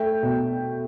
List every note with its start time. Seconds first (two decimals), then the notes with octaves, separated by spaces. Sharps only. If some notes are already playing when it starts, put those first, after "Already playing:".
Already playing: A3 E5 G5
0.23 B2